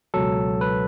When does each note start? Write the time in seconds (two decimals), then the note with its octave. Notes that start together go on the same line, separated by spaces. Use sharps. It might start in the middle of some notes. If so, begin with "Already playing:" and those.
0.14 C#2 B2 F#3 A4
0.61 B4